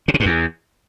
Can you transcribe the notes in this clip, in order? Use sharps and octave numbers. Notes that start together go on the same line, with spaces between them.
C#3
C3
G2
E2